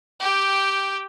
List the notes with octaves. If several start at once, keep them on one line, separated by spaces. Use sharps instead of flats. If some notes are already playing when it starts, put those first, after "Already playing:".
G4 G5